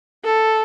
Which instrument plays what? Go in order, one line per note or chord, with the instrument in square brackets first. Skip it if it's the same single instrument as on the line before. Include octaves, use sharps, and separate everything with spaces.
[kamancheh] A4